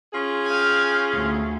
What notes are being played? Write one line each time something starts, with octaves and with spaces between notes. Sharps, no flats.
C#4 F4 G#4
F5 G5 G#5
D2